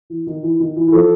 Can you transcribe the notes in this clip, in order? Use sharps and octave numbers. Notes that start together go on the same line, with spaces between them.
E3
D#3
E3
D#3
E3
E3
F3 A4